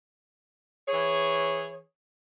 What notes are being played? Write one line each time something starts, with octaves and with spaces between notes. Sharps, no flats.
E3 G#4 C#5